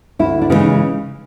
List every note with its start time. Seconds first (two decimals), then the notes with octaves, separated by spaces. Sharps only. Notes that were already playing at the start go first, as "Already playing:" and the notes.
0.19 D2 E4
0.42 D4
0.50 C#3 E3 G#3 B3
0.54 D#4